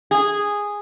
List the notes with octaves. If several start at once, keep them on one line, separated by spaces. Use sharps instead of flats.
G#4